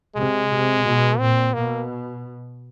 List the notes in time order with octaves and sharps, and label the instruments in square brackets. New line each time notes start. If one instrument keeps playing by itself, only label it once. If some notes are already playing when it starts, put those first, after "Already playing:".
[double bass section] C3 [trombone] G#3
[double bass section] C3
B2
[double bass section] A#2 [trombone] C4
[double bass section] B2 [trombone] A#3